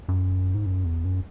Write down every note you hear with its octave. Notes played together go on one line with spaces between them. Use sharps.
F#2
G#2
F#2
E2
F#2